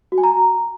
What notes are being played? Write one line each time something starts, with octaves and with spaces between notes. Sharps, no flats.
F#4
G#5
A#5